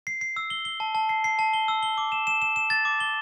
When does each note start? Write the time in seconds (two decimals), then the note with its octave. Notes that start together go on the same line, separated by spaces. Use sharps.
0.07 C7
0.21 C7
0.36 E6
0.50 G7
0.65 G7
0.80 A5
0.95 A5
1.09 C7
1.24 C7
1.39 A5
1.53 G7
1.68 E6
1.83 G7
1.98 D6
2.12 E7
2.27 E7
2.42 E7
2.56 E7
2.70 A6
2.85 D6
3.00 G7